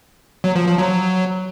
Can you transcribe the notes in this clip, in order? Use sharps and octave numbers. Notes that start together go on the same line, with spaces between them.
F#3
F3
F3
F#3